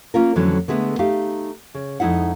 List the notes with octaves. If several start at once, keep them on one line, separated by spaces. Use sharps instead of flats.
A#3 C#4 F4 A#4
F2 D3 E3 F#3 A3 C#4
D3 G#3 A3 B3
A3 D#4 G4 F5
C#3
F2 G#3 D#4 E4 F#5